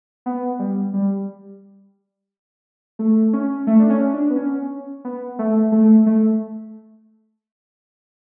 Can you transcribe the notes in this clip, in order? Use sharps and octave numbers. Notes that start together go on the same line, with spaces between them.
B3
G3
G3
A3
C#4
A3
D4
C#4
D4
B3
C#4
B3
A3
A3
A3